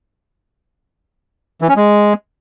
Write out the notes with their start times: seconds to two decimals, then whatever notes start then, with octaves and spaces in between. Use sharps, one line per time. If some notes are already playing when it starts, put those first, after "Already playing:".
1.61 E3
1.69 C#4
1.76 G#3